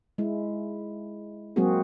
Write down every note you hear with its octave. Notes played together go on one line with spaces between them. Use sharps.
G#3 E4
F#3 G#3 A#3 C4 F#4 G#4